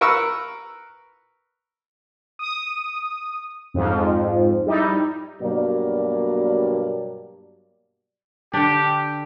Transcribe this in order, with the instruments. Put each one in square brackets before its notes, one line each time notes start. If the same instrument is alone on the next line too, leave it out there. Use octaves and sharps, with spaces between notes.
[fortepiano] A#4 B4 C#6 E6
[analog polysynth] D#6
F2 G#2 F3
G3 D#4 E4
[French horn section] G2 B2 F#3 A#3 D5
[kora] D3 D4 [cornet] G4